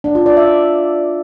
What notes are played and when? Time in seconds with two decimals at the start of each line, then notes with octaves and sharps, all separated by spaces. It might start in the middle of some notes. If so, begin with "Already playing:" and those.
0.04 D4
0.15 F4
0.26 D5
0.37 E5